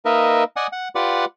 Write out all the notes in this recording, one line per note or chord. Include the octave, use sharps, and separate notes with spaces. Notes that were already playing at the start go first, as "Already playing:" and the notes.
A#3 D#4 A#4 B4 D#5 E5
D5 D#5 F#5 G#5 D#6
F#5
F4 G4 B4 D5 F#5 D6